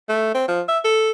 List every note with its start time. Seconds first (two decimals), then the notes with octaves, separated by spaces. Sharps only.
0.09 A3
0.35 C4
0.48 F3
0.69 E5
0.85 A4